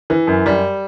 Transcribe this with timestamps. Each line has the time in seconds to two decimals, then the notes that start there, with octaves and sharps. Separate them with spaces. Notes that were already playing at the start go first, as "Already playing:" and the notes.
0.10 E3
0.27 F#2
0.46 G3